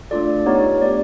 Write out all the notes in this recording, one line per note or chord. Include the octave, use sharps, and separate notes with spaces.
A3 D4 F4 A4 D5
B3 D#4 G4 C#5
A3 D4 G4 D5